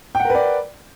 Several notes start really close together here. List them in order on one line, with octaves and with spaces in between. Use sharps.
G5 F#5 A#4 B4 D5